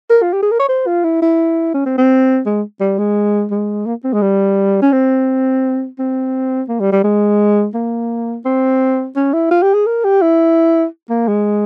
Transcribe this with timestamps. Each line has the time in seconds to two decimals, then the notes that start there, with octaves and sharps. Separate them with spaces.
0.10 A#4
0.22 F4
0.33 G4
0.42 G#4
0.51 A#4
0.60 C#5
0.69 C5
0.87 F4
1.04 E4
1.22 E4
1.74 C#4
1.86 C4
1.98 C4
2.46 G#3
2.81 G3
2.98 G#3
3.51 G#3
3.86 A#3
4.04 C4
4.13 G#3
4.22 G3
4.82 C#4
4.92 C4
5.99 C4
6.69 A#3
6.80 G3
6.92 G3
7.04 G#3
7.74 A#3
8.45 C4
9.16 C#4
9.34 E4
9.51 F4
9.63 G4
9.74 G#4
9.86 A#4
10.04 G4
10.22 E4
11.10 A#3
11.28 G#3